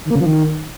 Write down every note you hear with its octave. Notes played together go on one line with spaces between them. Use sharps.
D#3
A#3
C#3
F3
D#3